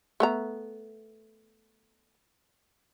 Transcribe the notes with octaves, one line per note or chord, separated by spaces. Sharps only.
A3 B3 A#5